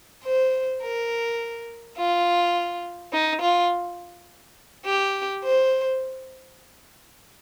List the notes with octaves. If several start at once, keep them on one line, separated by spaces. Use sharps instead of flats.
C5
A#4
F4
D#4
F4
G4
C5